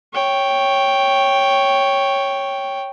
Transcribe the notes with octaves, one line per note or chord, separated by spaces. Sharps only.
C#5 G5